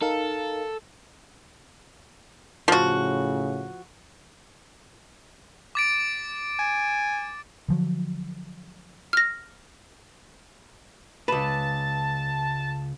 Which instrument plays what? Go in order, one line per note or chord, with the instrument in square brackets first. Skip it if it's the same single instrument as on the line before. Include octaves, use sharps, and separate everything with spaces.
[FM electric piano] D#4 A#4 F5 [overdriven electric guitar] A4
[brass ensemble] A2 C#3 [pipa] F3 F#4
[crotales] D6 A6 D7
[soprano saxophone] G#5
[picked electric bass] D3 F3 F#3
[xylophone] F6 A#6
[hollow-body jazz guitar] C#2 B4 [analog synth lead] A5